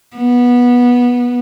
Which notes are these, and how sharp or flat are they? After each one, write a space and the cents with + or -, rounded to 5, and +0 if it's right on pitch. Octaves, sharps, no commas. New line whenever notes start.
B3 -15